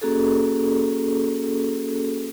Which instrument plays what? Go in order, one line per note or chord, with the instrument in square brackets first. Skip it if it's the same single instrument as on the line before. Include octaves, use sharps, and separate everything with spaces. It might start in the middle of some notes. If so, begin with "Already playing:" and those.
[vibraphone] A#3 C#4 F#4 G#4 A4